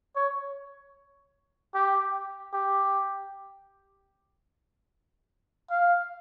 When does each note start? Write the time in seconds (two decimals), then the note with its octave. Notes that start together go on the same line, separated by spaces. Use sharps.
0.16 C#5
1.75 G4
2.53 G4
5.70 F5